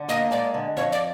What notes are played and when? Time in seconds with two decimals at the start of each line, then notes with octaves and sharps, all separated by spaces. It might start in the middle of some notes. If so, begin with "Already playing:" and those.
Already playing: D3
0.08 A#3 D#5
0.31 G#3 D5
0.54 D3
0.77 F2 C#5
0.92 D5